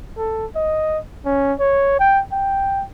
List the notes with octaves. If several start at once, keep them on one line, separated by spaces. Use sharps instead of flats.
A4
D#5
C#4
C#5
G5
G5